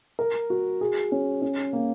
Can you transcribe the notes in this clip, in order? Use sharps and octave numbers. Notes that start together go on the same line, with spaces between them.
A#4
F#4
G#4
C#4
C#4
A#3